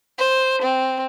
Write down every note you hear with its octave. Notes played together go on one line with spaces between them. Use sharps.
C5
C4